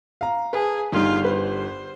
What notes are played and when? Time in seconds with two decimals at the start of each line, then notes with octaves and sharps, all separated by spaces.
0.21 F5 A#5
0.53 G#4 B4 A5
0.92 G1 D#3 G3 D#4 F4
1.24 B4 C5